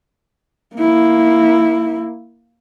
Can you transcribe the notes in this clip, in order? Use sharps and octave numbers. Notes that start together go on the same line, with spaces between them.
A#3 E4